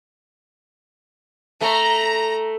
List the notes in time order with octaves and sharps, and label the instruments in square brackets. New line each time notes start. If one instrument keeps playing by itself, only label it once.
[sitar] A3 [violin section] A#5